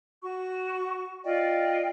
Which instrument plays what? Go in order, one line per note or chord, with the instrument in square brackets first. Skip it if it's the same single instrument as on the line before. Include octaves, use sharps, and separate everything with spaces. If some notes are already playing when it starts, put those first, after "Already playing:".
[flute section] F#4 C#6
F4 D5 D#5 G5